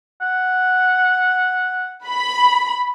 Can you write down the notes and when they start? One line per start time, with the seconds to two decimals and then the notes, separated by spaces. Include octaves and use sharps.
0.21 F#5
2.07 B5